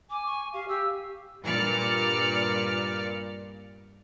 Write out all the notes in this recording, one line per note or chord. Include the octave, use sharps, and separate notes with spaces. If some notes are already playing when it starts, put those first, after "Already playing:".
G#5 D6
C#6
G4 F5
G4 E6
G2 A#2 D5 F6 C#7